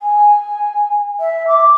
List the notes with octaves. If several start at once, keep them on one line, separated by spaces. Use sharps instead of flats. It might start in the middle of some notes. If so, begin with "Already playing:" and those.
G#5
E5
D6